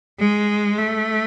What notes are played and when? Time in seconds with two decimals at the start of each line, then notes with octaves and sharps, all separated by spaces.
0.19 G#3
0.78 A3